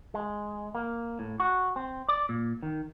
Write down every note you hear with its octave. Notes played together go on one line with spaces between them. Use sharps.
G#3
A#3
A2
F#4
C4
D5
A#2
D#3